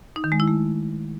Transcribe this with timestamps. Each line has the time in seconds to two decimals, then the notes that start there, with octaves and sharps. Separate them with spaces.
0.16 D#4
0.24 D#3
0.32 G#3
0.40 E4
0.48 A3